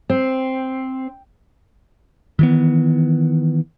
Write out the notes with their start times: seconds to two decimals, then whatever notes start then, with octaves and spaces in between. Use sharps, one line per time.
0.09 C4
2.39 D#3 E3 B3